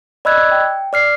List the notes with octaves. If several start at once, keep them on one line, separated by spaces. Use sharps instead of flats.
D5 D#5 B5 E6 F#6 G#6
G5
D5 F6 C7